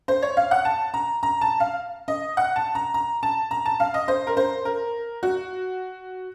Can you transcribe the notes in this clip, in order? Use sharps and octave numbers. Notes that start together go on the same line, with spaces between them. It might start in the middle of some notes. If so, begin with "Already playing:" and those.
C5
C#5
F5
F#5
A5
A#5
A#5
A5
F5
D#5
F#5
A5
A#5
A#5
A5
A#5
A5
F5
D#5
C5
A#4
C5
A#4
F#4